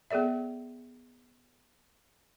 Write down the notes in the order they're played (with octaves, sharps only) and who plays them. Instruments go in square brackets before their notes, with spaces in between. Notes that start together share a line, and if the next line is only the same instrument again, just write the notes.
[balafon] B3 G#4 A4 D5 E5